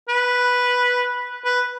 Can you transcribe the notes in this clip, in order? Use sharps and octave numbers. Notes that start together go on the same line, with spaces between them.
B4
B4